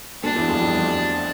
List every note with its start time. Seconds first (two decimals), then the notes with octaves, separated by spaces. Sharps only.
0.23 D2 D3 D4
0.36 E2 E3
0.48 F2 F3
0.61 F2 F3
0.69 G3
0.74 F2 F3